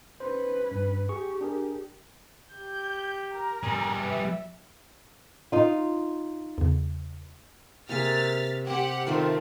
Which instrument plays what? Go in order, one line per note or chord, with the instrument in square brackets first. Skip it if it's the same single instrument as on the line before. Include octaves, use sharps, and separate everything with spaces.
[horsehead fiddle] C#4 B4 [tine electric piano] C5
[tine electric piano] G2
[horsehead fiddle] G4 [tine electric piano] G#4 C#6
[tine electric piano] D4 G#4 A#4
[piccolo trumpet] G4 [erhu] G6
[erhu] A#4
[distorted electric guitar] G3 G#4
[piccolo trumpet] B4 [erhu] E5
[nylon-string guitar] D#4 F4
[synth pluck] E2 C#3
[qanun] C3 A#3 G#4 [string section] F6 A6 B6
[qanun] C4 [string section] G4 F#5
[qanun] D#3 F4 D6 [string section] A3 C4